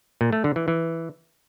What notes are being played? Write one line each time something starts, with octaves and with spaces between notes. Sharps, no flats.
A#2
A3
D3
E3
E3